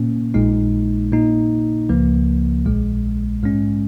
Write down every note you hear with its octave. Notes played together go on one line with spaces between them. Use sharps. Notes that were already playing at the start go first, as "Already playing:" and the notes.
Already playing: A#2 A#3 C#4
A#1 A#2 G#3 D#4
A#2 A#3 D#4
C#2 C#3 F3 A#3
A#1 A#2 G#3
G#2 G#3 C#4